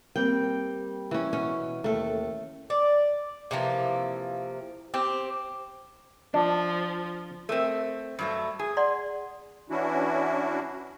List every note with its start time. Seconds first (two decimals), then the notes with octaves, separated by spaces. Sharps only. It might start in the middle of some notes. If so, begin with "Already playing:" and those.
0.16 G3 A#3 C4 G5
1.11 E3 C#4
1.33 B2 C#4
1.84 D#2 A3 A4
2.70 D5
3.51 C3 E3 F3 A#3
4.94 C4 G4
6.34 F3 D4
7.49 A3 C4 A4 A#4
8.19 G2 F#3 A3
8.59 G#4
8.77 D5 F#5 C6
9.70 E3 C#4 D4 E4 F#4